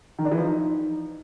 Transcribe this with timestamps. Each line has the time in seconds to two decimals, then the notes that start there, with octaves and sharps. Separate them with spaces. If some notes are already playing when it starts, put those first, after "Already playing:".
0.19 D#3
0.25 D4
0.32 E3
0.38 F3
0.45 D#4